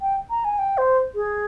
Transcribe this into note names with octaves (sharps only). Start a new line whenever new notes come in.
G5
A#5
G#5
G5
C5
G#4